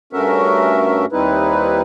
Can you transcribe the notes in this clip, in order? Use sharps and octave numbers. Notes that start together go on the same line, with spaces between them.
G2 A3 C#4 F#4 A#4 E5
D#2 G3 C4 D#4 E4 B4